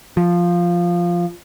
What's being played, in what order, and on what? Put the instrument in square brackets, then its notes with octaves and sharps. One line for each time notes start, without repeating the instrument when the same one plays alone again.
[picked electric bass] F3